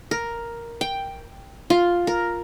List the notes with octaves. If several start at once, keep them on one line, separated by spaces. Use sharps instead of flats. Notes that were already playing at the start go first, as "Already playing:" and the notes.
A#4
G5
F4
A#4